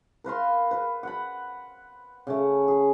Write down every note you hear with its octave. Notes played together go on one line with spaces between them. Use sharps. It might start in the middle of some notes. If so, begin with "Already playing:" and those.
A#4 B4 F5 C6
B4
F#5 B5
C#3 A3
G#4